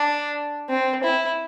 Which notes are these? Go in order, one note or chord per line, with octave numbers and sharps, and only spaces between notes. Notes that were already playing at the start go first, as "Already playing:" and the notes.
Already playing: D4
C4
E4